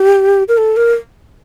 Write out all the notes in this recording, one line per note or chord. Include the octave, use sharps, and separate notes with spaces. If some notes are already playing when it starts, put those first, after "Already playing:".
Already playing: G4
A#4
A4
A#4